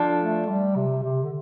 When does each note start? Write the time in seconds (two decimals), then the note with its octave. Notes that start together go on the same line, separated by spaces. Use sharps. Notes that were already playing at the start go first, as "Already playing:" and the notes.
Already playing: F3 D4 A4
0.20 A3
0.48 G3
0.76 C3
1.03 C3
1.23 D3